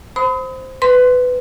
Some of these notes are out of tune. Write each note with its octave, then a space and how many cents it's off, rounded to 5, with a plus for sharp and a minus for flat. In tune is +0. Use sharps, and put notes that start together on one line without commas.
C5 +0 B5 +40 D#6 +35
B4 +15 C6 +0